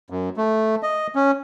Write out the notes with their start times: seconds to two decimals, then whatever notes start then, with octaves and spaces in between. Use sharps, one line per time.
0.10 F#2
0.37 A3
0.83 D#5
1.15 C#4